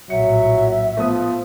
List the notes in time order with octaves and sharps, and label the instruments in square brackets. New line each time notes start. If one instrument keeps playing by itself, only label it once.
[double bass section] A#1 A2 [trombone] F#3 [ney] E5 [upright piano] C#7
[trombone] F3 [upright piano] A3 B3 D#6